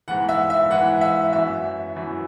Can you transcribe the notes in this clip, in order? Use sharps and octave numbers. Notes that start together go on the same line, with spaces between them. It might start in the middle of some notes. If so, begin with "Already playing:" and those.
G#2 E3 F#5
E5
E5
G#2 E3 F#5
E5
F#2 E3 E5
F#2 E3